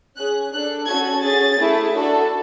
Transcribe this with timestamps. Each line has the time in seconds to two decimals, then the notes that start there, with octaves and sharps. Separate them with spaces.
0.16 C#4 G#4 F#6
0.52 D4 A4 F#6
0.86 C#4 F#4 A4 G#6
1.23 C#4 G#4 A6
1.58 A3 E4 G#4
1.94 D4 F#4 A4